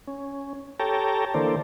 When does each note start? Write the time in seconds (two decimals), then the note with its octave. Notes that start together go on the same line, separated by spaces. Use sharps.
0.08 C#4
0.80 G4 A4 C#5 G5 A5 A#5
1.34 D3 E3 A#3 A4 C5 D5